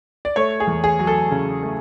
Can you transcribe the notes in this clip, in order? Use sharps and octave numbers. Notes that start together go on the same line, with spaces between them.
D5
A3 C#5
G#4
E2
G#4
F#3
A4
C#3
A3